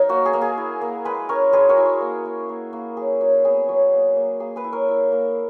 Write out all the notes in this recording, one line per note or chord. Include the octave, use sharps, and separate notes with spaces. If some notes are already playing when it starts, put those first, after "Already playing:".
Already playing: F#3 D#4 A#4
A#3 F#4
G#4
A#3
G#4
E4
A#3
G#3 G#4 B4
C#4 A#4 C#5
G#3 G#4 B4
F#4 A#4
E4
F#4
A#3
A#3
A#3
A#3
F#3 G#4
F#3 F#4
B3 G#4
F#3
A#3
A#3
A#3 G#4
G#4 B4
E4
A#4 C#5
E4
A#3